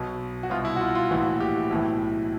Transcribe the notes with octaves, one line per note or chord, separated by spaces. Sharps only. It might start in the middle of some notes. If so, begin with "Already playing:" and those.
Already playing: B1 B2
F#4
C2 B2 F4
E4
F#4
F4
F4
A#1 A2 E3 F#4
G4
B1 A2 E3